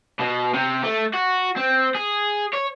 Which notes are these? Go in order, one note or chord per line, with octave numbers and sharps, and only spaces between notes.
B2
C3
A3
F#4
C4
G#4
C#5